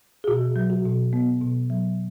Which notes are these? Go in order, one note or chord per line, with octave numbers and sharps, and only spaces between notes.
G#4
B2 F#4
F#3
F#4
B2
B3
B2
F#3